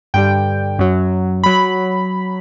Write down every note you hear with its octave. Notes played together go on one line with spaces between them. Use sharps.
G2 D3 G3 G5
F#2 F#3
F#3 B5